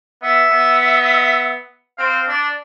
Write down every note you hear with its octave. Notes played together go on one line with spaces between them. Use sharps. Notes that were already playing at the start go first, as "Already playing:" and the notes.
B3 E5
B3
C4 F5
D4 D5